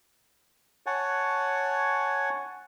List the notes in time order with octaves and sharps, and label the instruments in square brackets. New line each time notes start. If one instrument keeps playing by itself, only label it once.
[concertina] C#5 F#5 G#5 A5